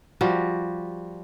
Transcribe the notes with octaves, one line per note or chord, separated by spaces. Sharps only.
F3 G3 F#4